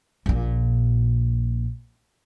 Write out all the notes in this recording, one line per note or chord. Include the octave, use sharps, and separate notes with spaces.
A#1 A#2